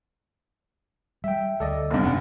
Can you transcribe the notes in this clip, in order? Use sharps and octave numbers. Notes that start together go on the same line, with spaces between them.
G3 E5 G5
D2 A4 D5 D#5
F1 G2
E1 C#3 F#5